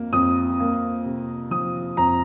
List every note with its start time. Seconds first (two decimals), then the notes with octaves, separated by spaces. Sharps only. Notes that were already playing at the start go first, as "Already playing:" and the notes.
Already playing: F2 A#3
0.13 F2 D#6
0.60 A#3
1.05 C3
1.51 F3 D#6
1.97 F2 A#5